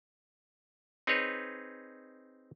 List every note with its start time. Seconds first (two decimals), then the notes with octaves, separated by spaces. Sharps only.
1.07 C4 D#4 G#4 B4 C#5